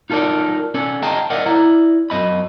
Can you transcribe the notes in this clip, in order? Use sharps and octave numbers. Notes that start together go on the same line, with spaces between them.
D#4 F4 A4 A#4 D5
C#4 A4 D5
G#4 D#5 F5 G5 A5 A#5
A#4 D5 D#5 F5 F#5
E4 D5 A#5
F#2 D#5 B5